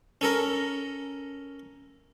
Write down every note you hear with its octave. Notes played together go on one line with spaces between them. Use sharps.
C#4 A4 A#4